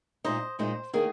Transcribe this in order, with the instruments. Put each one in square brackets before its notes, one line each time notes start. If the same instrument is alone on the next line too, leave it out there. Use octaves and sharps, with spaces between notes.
[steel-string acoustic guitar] A#2 G#3 D#4 [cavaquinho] C5 D#5
[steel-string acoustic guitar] A#2 G#3 D#4 [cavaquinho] C5
[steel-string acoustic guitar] D#3 A#3 D#4 [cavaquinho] G#4